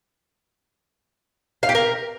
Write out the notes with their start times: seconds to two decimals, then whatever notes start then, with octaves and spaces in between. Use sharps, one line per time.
1.63 F5
1.69 G4
1.75 A#4